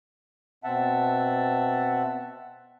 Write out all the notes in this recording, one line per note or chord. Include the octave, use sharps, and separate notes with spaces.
B2 C4 E5 F#5 A5